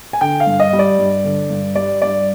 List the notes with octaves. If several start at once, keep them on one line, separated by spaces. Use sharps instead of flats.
G#5
D3 G5
F5
G2
D#5
G3
D5
G2
D3
G2
G3 D5
G2 D5